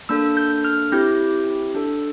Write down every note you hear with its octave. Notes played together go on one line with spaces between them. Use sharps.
A#3 D4 A4 E6
G6
F6
C4 E4 G4 G6
D4 A4